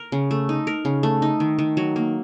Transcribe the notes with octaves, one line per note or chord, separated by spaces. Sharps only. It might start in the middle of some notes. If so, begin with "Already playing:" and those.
Already playing: A#4
C#3
A3
D#4
A#4
C#3
A3
D#4
D#3
D#3
F#3
A#3